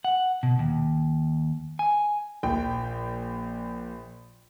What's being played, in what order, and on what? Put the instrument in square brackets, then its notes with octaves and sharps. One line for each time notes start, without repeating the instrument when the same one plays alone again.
[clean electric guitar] F#5
B2
D#2
G#5
[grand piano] A#1 G5